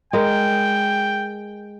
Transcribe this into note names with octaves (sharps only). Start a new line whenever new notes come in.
G#3 G#4 A#4 G5